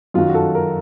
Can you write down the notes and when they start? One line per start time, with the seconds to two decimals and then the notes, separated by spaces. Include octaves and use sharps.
0.14 F#2 D#3 F#3 F4
0.29 F#4
0.35 A4
0.55 A#4